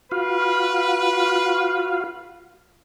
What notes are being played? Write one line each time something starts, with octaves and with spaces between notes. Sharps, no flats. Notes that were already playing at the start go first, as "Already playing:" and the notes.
F4 F#4 B4 F5